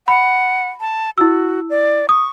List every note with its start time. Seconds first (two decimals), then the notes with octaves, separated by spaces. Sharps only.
0.08 F#5 B5
0.81 A5
1.18 E4 F#4 E6
1.70 D5
2.09 C#6 D#6